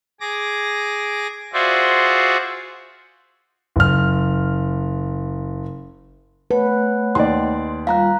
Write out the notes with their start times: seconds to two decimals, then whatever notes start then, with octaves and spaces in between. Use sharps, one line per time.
0.20 G#4 D6 A#6
1.53 F4 F#4 G#4 C5 D5 E5
3.76 F#1 F6
6.51 A3 B4 C#5 F#5
7.15 D#2 D5 C6
7.87 G3 F4 F5 A#5 F#6